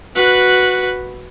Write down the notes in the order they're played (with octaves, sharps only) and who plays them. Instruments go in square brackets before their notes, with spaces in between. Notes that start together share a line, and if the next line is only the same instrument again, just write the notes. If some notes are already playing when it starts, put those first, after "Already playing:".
[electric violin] F#4 B4